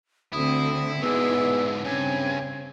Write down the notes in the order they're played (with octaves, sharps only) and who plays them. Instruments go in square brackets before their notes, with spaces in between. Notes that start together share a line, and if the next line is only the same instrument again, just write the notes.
[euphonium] D2 [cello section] D3 A3 C4 [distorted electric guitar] E4 [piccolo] D#6
[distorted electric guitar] G#2 B2 [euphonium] B3 [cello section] E4 G#4 D5 [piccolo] E6
[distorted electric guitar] G2 [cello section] C#3 C4 [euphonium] C#4 [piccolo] G#5